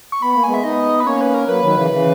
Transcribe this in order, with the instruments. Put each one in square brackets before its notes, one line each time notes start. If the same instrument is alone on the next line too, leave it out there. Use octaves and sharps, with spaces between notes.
[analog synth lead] C#6
[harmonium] B3 [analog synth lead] B5
[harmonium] A#3 [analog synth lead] B5
[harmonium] G#3 B3 [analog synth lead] G#5
[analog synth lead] E5
[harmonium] B3 D#4 [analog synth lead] D#5
[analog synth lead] B4
[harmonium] A#3 C#4 [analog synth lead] C#5
[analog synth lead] B4
A#4
[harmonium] F#3 A#3 [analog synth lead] B4
[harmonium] D#3 F#3
C#3 E3
C#3 E3